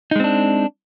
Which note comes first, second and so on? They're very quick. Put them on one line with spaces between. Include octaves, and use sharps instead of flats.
D#4 G#3 C4 D4